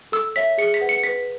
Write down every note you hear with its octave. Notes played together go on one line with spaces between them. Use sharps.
A4 E6
C#5 E5 B6
G#4 C#7
B6
B4 F#5
C#7
B4 B6